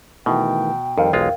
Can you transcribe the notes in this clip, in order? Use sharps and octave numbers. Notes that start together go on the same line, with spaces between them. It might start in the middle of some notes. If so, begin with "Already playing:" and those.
B2 D#3 E3 A3 G5
F2 D#3 G3 A#4 F5 G5
B1 E2 G#3 F4